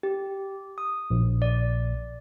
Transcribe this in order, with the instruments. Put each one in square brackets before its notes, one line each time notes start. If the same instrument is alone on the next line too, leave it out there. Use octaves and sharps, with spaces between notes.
[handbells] G4
D#6
[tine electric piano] A#1
[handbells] D5